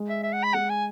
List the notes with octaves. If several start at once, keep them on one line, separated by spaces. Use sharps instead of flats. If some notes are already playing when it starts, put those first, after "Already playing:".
Already playing: G#3
E5
E5
F#5
B5
G#3 F#5
G#5